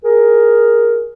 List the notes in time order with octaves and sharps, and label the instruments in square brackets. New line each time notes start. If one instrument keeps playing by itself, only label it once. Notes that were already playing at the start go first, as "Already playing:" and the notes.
[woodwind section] G#4 A#4